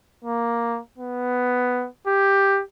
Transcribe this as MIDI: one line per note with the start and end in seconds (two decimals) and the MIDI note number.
0.25 0.79 58
0.98 1.87 59
2.07 2.61 67